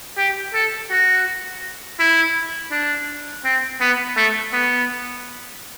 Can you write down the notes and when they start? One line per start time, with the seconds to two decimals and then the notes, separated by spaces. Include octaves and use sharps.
0.18 G4
0.54 A4
0.91 F#4
2.00 E4
2.71 D4
3.45 C4
3.81 B3
4.17 A3
4.53 B3